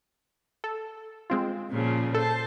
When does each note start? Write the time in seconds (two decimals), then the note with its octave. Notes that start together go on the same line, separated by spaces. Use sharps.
0.64 A4
1.30 G#3 C4 F4
1.70 A#2 C#3 F3
2.15 A4 C5 A5